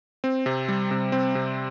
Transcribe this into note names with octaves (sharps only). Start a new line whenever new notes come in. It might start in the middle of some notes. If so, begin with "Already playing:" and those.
C4
C3
G3
C3
C4
C3